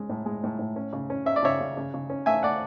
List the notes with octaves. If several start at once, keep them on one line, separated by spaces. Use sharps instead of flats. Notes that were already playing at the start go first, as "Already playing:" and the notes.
Already playing: G#3 C#4
A2
G#3
A2
A2
C#4
C#3
C#4
C#4 E5
D5
C#3 C#5 E5
C#3
C#3
C#3
C#4
A3 E5 G#5
A3 D5 F#5